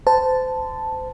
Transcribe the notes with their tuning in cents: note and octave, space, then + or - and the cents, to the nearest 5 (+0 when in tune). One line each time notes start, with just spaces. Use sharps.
C5 -30 A5 +0